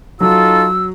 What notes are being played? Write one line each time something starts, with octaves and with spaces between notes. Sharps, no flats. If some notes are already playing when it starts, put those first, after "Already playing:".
F#3 D#4 F4 A4 E6